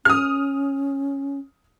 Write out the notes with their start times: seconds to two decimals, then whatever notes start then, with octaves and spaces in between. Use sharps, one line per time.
0.05 C#4 D#6 F6